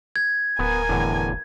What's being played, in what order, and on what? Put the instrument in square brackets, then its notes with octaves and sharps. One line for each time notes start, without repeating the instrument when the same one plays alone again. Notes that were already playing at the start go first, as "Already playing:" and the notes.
[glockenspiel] G#6
[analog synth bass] D1 [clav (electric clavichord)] B3 [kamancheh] A#4 G#5
[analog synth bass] F1 [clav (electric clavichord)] E2 A2 D3